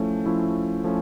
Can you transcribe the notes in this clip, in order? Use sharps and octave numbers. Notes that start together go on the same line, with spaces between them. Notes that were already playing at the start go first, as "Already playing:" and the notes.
Already playing: F3 A3 C#4 E4
F3 A3 C#4 E4
F3 A3 C#4